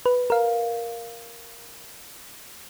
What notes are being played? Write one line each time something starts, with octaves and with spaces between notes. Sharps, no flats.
B4
A#4 F5